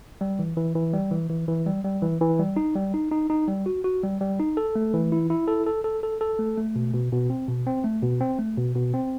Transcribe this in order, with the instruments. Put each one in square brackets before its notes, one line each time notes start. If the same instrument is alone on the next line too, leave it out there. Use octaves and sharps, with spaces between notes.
[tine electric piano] G3
E3
E3
E3
G3
E3
E3
E3
G3
G3
E3
E3
G3
D#4
G3
D#4
D#4
D#4
G3
F#4
F#4
G3
G3
D#4
A4
A3
E3
E4
E4
A4
A4
A4
A4
A4
A3
A3
B2
B2
B2
C4
B2
C4
A3
B2
C4
A3
B2
B2
C4